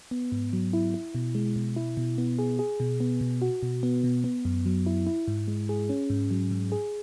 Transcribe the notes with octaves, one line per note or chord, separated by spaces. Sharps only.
B3
G#2
F#3
E4
E4
B2
G#3
B2
E4
B2
B3
G#4
G#4
B2
B3
B2
F#4
B2
B3
B2
B3
F#2
F#3
E4
E4
G#2
G#3
G#4
C#4
G#2
F#3
G#2
G#4